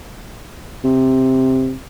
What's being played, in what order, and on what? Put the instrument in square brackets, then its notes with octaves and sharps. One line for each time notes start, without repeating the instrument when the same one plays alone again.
[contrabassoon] C3